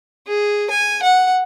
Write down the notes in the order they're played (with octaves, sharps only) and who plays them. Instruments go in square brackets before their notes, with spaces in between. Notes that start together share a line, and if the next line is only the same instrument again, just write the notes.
[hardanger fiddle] G#4
G#5
F#5